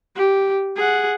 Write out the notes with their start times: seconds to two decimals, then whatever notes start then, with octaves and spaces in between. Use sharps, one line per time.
0.16 G4
0.76 G#4 F#5